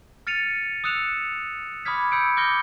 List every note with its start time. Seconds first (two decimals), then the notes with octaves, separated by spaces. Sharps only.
0.27 F6 A6 C#7 D#7 F7
0.84 D#6 E6 F#6 C#7 E7 F7
1.85 B5 D6 D#6 F6 G#6 B6
2.12 B5 E6 G6 C#7 D7
2.37 D6 F6 G6 A#6 C#7 G7